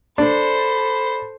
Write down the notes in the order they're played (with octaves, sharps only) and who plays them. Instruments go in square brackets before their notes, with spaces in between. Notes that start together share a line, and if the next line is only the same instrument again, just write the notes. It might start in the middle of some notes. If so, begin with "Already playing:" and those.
[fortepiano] D4 [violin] A4 C5 [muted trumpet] B5